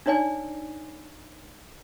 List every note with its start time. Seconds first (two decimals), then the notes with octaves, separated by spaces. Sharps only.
0.06 D4 D#4 C#5 D5 G#5